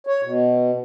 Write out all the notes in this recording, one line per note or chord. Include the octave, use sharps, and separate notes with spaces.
C#5
B2